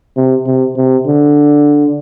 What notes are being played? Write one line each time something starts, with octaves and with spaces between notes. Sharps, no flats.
C3
C3
C3
D3